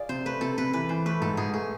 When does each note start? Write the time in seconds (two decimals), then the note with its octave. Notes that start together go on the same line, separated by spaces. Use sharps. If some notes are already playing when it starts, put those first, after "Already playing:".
Already playing: F4 G#4 D5
0.09 C3 C5
0.26 A3 B4
0.41 C3 A4
0.58 C3 B4
0.73 E3 B4
0.89 E3 C5
1.06 A3 B4
1.21 G#2 A4
1.37 G#2 G#4
1.54 A3 G#4